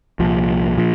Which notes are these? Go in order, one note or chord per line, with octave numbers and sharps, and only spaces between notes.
C2 A#2 F3
A#2 F3